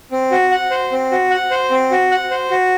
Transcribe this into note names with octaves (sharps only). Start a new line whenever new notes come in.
C4
F#4
F#5
C5
C4
F#4
F#5
C5
C4
F#4
F#5
C5
F#4